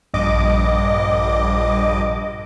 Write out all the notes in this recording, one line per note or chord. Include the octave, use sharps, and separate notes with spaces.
A#1 G2 D#5 D6